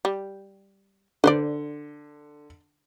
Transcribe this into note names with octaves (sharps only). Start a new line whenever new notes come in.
G3
D3 B4 C5 D5